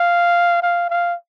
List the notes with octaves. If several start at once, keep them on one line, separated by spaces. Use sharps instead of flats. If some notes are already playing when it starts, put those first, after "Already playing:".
Already playing: F5
F5
F5